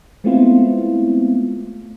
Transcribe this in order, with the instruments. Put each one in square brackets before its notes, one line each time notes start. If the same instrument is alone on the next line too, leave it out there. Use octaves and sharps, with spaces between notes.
[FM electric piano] G#3 A3 B3 C4 E4 F4